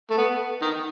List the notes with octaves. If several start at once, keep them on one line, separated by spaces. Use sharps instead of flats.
A3
B3
D#3